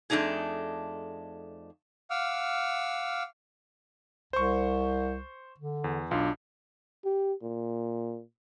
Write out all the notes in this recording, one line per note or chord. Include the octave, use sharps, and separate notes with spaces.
F2 A3 D4 D#4 G#4
F5 F#5 D6 E6 F6
C2 C5 C#6
D3
E2
B1 D4 F4
G4
A#2